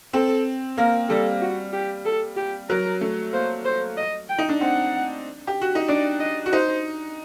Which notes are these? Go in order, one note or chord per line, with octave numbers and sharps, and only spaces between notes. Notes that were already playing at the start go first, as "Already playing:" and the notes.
C4 A4
A#3 A#4
G3 A4
F#4
G4
A4
G4
F#3 A#4
A3
A#3 C5
C5
D#5
G5
D#4
D4
C4 F#5
G4
F#4
D#4
D4 D5
D#5
F#4
D#4 C5